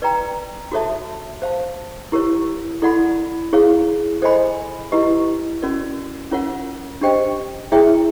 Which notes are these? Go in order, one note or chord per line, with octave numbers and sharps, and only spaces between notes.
B4 D5 G5 A#5
F#4 A4 C#5 E5 A5
C5 F5 A5
E4 G4 A#4 C#5
E4 A4 D5 F#5 B5
E4 G#4 C#5 F5
A4 C5 D#5 G#5 B5
E4 G4 B4 D#5
C#4 F#4 A#4 D5
C#4 F4 A#4 C#5 F#5
D4 G4 C5 D#5 G5
E4 G#4 C#5 E5 G5